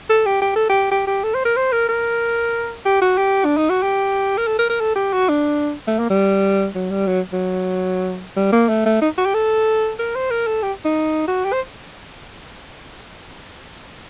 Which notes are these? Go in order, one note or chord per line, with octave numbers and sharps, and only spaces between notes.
A4
G4
G4
A4
G4
G4
G4
A4
C5
A#4
C5
A#4
A#4
G4
F#4
G4
D4
D#4
F#4
G4
A#4
A4
A#4
A#4
A4
G4
F#4
D4
A3
A#3
G3
F#3
G3
F#3
F#3
G3
A#3
A3
A3
D#4
F#4
G4
A4
A#4
C5
A#4
A4
G4
D#4
F#4
G4
C5